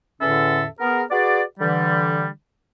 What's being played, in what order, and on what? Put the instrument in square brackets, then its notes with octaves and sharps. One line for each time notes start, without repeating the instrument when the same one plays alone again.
[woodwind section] E2 A2 D3 C#4 A4 E5
B3 G#4 A#4
F#4 G#4 B4 D5
D3 E3 G3